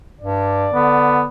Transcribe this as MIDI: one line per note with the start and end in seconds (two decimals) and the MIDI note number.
0.21 0.67 43
0.21 1.28 74
0.74 1.23 50
0.74 1.27 59